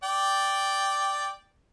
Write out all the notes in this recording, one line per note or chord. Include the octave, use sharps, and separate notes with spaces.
D5 G5